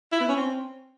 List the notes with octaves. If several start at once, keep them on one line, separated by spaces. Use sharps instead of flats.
E4
B3
C#4
C4